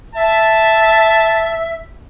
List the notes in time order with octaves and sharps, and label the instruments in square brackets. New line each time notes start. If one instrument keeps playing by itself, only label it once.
[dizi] E5 [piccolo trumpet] A5